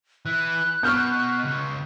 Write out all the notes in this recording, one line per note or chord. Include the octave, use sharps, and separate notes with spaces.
E3 F#6
B2 C#6 F6 G6
C#2